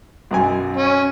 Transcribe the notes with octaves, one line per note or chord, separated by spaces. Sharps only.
B1 F#2 G#5
C#4